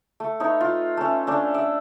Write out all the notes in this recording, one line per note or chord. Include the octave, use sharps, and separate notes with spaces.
A3
A3 D#4 B4 C#5
F4
A3 C#4
A3 C#4 D4
D5 E5